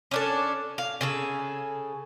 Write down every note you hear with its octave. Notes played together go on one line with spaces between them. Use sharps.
C#4 D4 A4
F5
C#3 G#4 A4